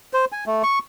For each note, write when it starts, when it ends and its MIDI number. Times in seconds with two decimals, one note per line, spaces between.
0.13 0.25 72
0.32 0.44 80
0.46 0.62 57
0.63 0.79 85